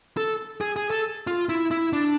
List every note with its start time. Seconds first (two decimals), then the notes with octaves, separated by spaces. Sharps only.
0.17 A4
0.61 G#4
0.76 G#4
0.91 A4
1.27 F4
1.49 E4
1.71 E4
1.93 D4